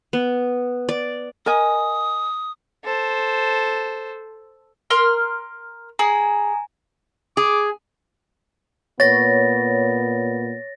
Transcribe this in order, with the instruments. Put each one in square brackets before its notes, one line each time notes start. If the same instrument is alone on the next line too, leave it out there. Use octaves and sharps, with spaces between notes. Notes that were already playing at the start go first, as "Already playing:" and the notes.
[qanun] B3
D5
[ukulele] A#4 D#5 G#5 [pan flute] D#6
[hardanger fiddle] A4 C5
[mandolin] A#4 C6 F6
[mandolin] G#4 [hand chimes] G#5 A#5
[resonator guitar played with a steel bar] G#4 [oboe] D6
[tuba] A#2 [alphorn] B3 [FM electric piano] C#5 [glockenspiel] A6 A#6